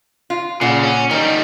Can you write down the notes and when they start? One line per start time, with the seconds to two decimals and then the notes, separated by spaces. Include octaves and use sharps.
0.30 F4
0.61 A#2 C#3 F#5
0.83 C#4
1.11 D#3 G3 D#4